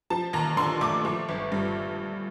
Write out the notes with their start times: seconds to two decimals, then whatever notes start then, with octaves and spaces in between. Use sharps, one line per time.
0.10 F3 A5
0.33 D#2 A#5
0.57 D3 C6
0.81 A3 D6
1.05 F3
1.29 G1
1.52 G2